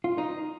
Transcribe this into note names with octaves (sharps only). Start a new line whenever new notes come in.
F4
D#4